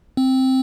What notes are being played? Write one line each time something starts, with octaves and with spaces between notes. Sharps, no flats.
C4